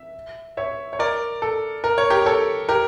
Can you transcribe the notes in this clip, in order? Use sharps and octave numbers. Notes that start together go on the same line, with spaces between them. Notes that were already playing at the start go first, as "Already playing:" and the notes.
Already playing: E5
C#5 E5
C#5
A#4 D5
A4
A#4
C#5
G4 A#4
A4 C#5
G4 A#4